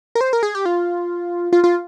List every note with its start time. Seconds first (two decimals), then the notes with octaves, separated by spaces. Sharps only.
0.15 A#4
0.21 C5
0.33 A#4
0.43 G#4
0.55 G4
0.66 F4
1.53 F4
1.64 F4